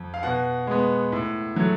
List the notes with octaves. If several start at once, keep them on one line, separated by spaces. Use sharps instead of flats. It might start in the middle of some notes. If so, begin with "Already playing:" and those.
Already playing: F2
F5
B2 F#5
G#3 B3
A2
F#3 A3